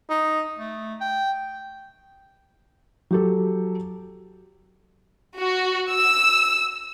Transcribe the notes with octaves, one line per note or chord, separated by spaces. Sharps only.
D#4
A3
G5
F#3 G4 A4
F#4
E6